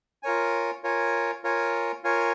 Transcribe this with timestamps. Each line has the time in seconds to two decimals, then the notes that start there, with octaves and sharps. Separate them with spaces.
0.23 F4 A#4 C#5 G#5
0.84 F4 A#4 C#5 G#5
1.44 F4 A#4 C#5 G#5
2.04 F4 A#4 C#5 G#5